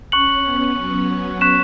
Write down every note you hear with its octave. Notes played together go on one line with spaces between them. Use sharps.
C#4 C#6 F#6 C#7 F#7
B3
F#3
C#6 F#6 B6 E7